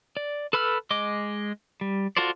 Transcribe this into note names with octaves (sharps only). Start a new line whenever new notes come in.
D5
A4 B4 B5 E6 F6
G#3 D#5 D6
G3
F4 F#4 A4 C5 D5